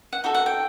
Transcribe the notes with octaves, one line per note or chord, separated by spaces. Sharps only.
F#5
D#4 F#4 A4
F#5
G5